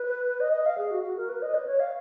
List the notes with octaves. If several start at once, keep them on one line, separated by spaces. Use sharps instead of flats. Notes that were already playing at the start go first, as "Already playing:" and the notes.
Already playing: B4
D#5
D#5
F5
G#4
F#4
F#4
A#4
B4
D#5
B4
C#5
F5